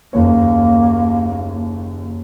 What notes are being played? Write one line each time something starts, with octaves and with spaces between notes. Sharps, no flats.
F#1 D#2 A#3 C#5